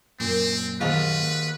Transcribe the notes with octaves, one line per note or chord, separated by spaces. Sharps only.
F#2 A#2 A#3 C4
D#2 G#2 F4 B4